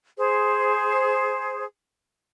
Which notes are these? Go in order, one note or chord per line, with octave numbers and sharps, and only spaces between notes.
G#4 C5